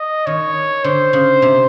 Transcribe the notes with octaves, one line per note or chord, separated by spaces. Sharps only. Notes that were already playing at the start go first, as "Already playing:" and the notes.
Already playing: D#5
D#3 C#5
D3 C5
C#3
C3